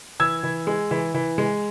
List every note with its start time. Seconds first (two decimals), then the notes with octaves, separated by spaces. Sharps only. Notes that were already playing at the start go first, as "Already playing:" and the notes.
0.20 E3 E6 G#6
0.43 E3
0.67 G#3
0.91 E3
1.14 E3
1.38 G#3